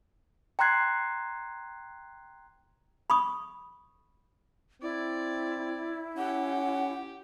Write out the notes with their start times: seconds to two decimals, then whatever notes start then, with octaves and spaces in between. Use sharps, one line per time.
0.59 G5 A#5 C6 F#6 G#6 C7
3.10 B5 C#6 D#6
4.82 C4 E4 D5
6.17 C#4 G4 F#5